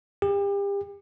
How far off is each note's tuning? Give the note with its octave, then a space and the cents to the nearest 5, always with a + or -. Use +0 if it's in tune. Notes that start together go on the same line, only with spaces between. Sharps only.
G4 +35